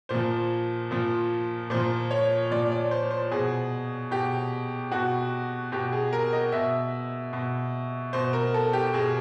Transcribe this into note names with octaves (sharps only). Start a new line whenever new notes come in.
A#2 F3 C5
A#2 F3
A#2 F3 C5
C#5
A#2 F3 D5
D5
C5
C5
B2 G#4
B2 G4
B2 F#4
B2 G4
G#4
A#4
D#5
B2 E5
B2
B2 C5
A#4
A4
G4
B2 G#4